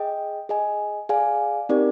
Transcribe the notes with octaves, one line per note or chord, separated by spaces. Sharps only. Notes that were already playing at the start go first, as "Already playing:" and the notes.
Already playing: G#4 D#5 G5
G#4 D#5 G#5
G#4 D5 F5 G#5
C4 D#4 G4 A#4 D5